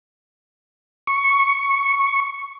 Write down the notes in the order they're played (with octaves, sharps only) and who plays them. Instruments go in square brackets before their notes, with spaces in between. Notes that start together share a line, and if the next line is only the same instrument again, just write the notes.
[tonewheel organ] C#6